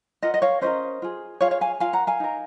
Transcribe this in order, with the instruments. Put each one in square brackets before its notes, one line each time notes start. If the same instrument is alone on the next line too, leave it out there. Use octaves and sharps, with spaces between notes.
[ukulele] F4 A#4 D#5 F#5
D#5
C#5 F5
C#4 F#4 A#4 C5 D#5
F4 G#4
F4 G#4 C#5 F5
C#5 F5
F5 G#5
F4 A#4 F5 G#5
F#5 A#5
F5 G#5
D#4 A#4